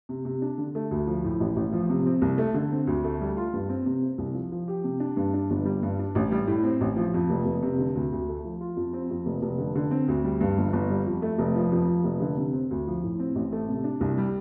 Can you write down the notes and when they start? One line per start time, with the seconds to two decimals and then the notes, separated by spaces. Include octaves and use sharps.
0.09 C3
0.25 C3
0.42 D4
0.58 D3
0.75 A3
0.91 D2
1.07 F3
1.24 A2
1.40 A1
1.56 A1
1.72 F3
1.90 C3
2.06 C4
2.22 C2
2.38 A3
2.54 D3
2.72 C4
2.87 D2
3.04 A3
3.21 G3
3.37 F4
3.53 G2
3.69 C4
3.86 C3
4.02 C4
4.18 C2
4.34 F3
4.52 F3
4.68 G4
4.84 C3
5.00 D4
5.17 G2
5.34 D4
5.50 G1
5.65 G3
5.83 G2
5.99 D4
6.15 A1
6.31 G3
6.47 A2
6.64 C4
6.81 A1
6.97 F3
7.14 F2
7.30 F1
7.45 F1
7.63 C3
7.79 D3
7.96 D2
8.12 D2
8.28 A3
8.44 F3
8.61 F4
8.76 F2
8.93 C4
9.10 F2
9.26 F1
9.42 F1
9.58 D3
9.75 D3
9.91 C4
10.08 D2
10.24 G3
10.41 G2
10.58 G1
10.73 G1
10.90 G3
11.06 F2
11.22 A3
11.38 F1
11.56 F3
11.72 F2
11.89 F3
12.04 F1
12.21 D3
12.37 C3
12.53 C4
12.71 D2
12.87 F3
13.03 A2
13.19 C4
13.35 A1
13.52 A3
13.69 C3
13.84 D4
14.01 C2
14.18 G3